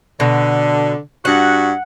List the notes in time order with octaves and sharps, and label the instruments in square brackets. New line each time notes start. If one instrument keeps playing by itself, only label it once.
[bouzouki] B2 [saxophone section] D3
[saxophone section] G2 F#4 [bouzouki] F#5